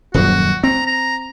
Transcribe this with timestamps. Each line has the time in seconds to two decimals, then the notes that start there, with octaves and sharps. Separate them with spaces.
0.14 D#1 F#2 F3 F#4
0.64 C4 A#5
0.87 A#5